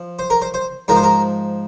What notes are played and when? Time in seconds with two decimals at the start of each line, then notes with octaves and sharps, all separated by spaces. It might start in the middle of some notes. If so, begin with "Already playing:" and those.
Already playing: F3
0.19 C5
0.30 A#4
0.42 C5
0.54 C5
0.88 G#2 F3 A#4
0.96 C5
1.03 A#4